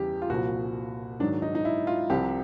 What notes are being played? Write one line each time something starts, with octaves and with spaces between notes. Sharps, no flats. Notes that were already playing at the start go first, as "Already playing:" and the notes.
Already playing: E2 C#3 E3 G3 G4
F4
C2 A#2 F3 F#4
G#2 D#3 F#3 D4
D#4
D#4
E4
F4
C2 C3 F3 G4